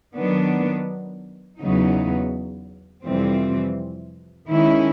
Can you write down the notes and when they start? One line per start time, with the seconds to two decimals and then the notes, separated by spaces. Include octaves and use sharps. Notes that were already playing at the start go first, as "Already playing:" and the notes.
0.15 D#3 F#3 B3 D4
1.59 E2 C#3 F#3 B3 D#4
3.04 F2 C3 E3 G3 C4
4.49 D#3 G#3 C#4 E4